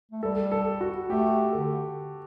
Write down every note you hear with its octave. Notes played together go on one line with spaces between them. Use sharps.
A3
G3 A4
A4
F#4
A3 G4
D3 A4